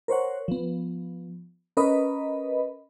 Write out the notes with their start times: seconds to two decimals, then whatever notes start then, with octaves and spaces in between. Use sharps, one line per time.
0.08 A#4 C5 C#5 F#5
0.48 F3 B3
1.77 C#4 A#4 B4 D#5 B5